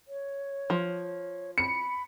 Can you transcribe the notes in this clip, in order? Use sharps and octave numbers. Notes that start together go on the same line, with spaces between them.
C#5
F3
B5 C#7